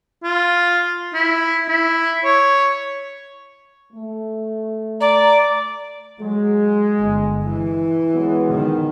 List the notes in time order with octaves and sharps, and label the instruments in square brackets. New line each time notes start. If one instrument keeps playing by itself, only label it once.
[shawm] F4
E4
E4
C#5
[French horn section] A3
[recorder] D5 [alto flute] A#5
[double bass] F#3 [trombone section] G#3
[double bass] G1
E3
[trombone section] F#3 G#3 B3
[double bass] D#3